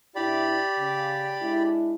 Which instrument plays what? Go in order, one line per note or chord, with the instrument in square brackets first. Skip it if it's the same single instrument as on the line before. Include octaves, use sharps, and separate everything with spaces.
[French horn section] G2 D4 E4 [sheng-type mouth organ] G4 D5 B5
[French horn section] C#3
G#3 D4 E4